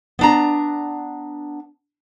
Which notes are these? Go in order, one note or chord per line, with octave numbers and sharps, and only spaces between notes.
B3 D4 A#5